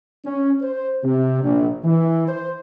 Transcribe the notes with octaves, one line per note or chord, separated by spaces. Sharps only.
C#4
C5
C3
A#1
E3
C5